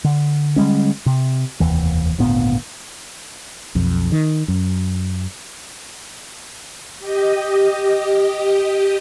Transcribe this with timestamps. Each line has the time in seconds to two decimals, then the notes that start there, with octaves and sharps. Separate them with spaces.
0.04 D3
0.56 D3 G3 G#3 C#4
1.06 C3
1.60 F1 D#2 E3
2.18 G#1 D2 A#2 B3
3.75 B1 F2
4.12 D#3
4.48 F#2
7.00 G4 D#5